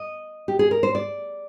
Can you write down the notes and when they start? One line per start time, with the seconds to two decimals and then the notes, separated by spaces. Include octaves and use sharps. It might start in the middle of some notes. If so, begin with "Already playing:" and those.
Already playing: D#5
0.48 G4
0.59 G#4
0.71 A#4
0.83 C5
0.95 D5